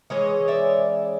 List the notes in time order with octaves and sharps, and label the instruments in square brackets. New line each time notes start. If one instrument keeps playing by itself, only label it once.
[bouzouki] E3 G#3 C#4 C#5 D#5
D5 E5